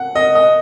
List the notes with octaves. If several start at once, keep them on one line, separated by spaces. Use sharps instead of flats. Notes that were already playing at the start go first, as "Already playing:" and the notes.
Already playing: F#5
D#5
D#5